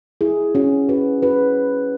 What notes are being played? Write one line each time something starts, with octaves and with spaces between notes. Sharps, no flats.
E4 G#4
C#4 F#4
F#4 B4
F#4 B4